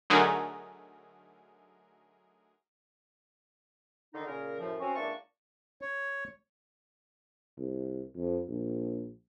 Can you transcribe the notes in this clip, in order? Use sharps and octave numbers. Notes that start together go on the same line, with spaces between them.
D3 F#3 A3 D#4 G#4 A#4
D3 D#3 D#4
A#2 C#3 A#4
F#2 A2 F3
C4 C#4 F#4
C#2 A#3 D4 E4 A5 C#6
C#5
C2
F2
A#1